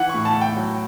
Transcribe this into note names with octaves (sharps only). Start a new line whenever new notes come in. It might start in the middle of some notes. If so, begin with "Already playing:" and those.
Already playing: E3 F#5
A2 C#6
A5
A2
G5
F#3